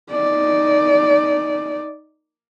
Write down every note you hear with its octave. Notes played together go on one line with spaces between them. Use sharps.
D#4 D5